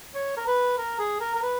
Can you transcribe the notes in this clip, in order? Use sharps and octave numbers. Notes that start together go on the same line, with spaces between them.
C#5
A#4
B4
A#4
G#4
A#4
A#4
B4